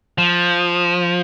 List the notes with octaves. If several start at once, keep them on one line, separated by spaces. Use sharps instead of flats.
F3